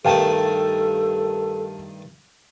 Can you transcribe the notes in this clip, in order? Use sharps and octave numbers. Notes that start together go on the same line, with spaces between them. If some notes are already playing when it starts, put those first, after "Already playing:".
G2 D#3 A3 A4 F5 G5 A5